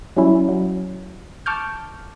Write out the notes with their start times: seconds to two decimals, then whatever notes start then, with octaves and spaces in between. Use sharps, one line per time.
0.16 F#3 G3 C#4 E4
0.49 F#3
1.46 A5 C#6 D6 F6 G6